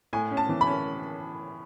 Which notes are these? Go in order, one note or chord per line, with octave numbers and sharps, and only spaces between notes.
A2 G#5
C#4
A5
E3
B5
C#4